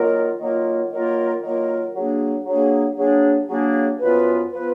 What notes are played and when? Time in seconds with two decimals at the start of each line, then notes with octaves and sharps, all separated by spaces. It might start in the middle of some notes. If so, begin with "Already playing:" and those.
Already playing: D#3 F#3 A#3 F4 A#4
0.40 D#3 F#3 A#3 F4 A#4
0.91 D#3 F#3 A#3 F4 A#4
1.43 D#3 F#3 A#3 F4 A#4
1.94 F#3 A#3 D4 G#4
2.46 F#3 A#3 D4 G#4
2.97 F#3 A#3 D4 G#4
3.49 F#3 A#3 D4 G#4
4.00 F#2 F3 B3 F4 B4
4.51 F3 B3 F4 B4